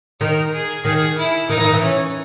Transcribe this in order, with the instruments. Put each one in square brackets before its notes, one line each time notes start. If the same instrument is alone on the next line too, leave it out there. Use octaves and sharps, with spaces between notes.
[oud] D#3 [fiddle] A#4
[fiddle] G#4
[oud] D#3 [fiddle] G#4
[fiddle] E4
[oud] D#3 [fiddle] D#4
[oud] E3
D#3
E3
[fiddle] C#4